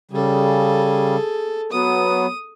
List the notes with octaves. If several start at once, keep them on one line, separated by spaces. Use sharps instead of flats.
C#3 G3 G#4 A4
F#3 B3 D#6